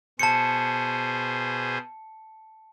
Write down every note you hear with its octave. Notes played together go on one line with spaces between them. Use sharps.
B2 G#4 C5 A5 C#7